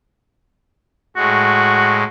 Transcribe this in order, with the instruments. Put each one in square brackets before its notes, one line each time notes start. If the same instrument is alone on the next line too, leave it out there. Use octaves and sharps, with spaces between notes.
[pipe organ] A2 G#3 [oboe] F#4